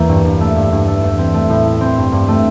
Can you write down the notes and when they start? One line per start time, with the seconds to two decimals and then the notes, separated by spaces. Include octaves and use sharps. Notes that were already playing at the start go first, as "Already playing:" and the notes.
Already playing: E2 A#3
0.09 G2
0.25 G2
0.41 A3
0.56 G2
0.72 G2
0.88 A3
1.03 E2
1.18 C4
1.34 A3
1.49 A2
1.65 E4
1.81 C4
1.96 G2
2.12 G2
2.28 A3